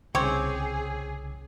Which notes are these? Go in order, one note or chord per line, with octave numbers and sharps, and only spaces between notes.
C2 C#3 C4 G#4 C#5 D6